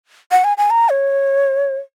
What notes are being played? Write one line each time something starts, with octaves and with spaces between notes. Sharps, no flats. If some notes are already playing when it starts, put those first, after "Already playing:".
F#5
G#5
G#5
A#5
C#5